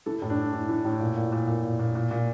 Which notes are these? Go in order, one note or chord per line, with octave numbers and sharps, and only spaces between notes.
E3 A4
A2
D4
E3
E3
E3
A2
A#2
A#2
A#2
A#2
A#2
A#2
A#2
A#2